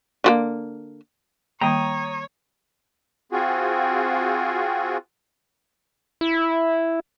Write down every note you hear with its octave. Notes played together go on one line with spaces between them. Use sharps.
D3 F#3 A#3
D#3 G3 A#3 C#5 G5 A#5 D#6
C4 F4 F#4 G#4
E4